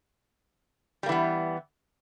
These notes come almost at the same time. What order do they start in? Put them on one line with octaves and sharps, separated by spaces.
G3 A#3 E3 B3